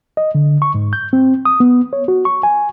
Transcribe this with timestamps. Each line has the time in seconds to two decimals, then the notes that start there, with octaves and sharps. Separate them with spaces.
0.17 D#5
0.35 D3
0.62 C#6
0.75 G#2
0.93 G6
1.13 C4
1.45 D#6
1.60 B3
1.93 C#5
2.08 F#4
2.25 C#6
2.43 G#5